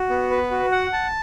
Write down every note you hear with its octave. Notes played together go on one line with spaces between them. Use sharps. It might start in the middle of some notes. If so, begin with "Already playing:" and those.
Already playing: F#4
B3
B4
F#4
F#5
A5